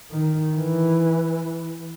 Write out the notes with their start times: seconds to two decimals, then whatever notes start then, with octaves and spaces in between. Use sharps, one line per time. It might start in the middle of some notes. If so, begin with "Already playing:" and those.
0.12 D#3
0.54 E3